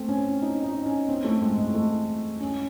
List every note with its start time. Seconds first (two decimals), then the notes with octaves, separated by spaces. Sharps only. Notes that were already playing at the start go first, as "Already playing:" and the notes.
Already playing: A3 C4
0.09 C#4
0.42 D#4
0.64 D#4
0.86 C#4
1.09 C4
1.24 A3
1.42 G#3
1.58 G#3
1.74 A3
2.40 C#4